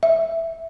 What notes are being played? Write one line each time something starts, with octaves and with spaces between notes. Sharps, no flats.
E5